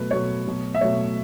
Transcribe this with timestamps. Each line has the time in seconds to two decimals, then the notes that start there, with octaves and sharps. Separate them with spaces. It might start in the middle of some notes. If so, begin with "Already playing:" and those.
Already playing: B2 F#3 A3 B4
0.11 B2 F#3 A3 C#5
0.46 B2 F#3 A3
0.75 E5
0.81 B2 F#3 A3 C#5